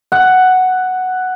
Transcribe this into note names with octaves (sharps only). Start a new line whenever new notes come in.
F#5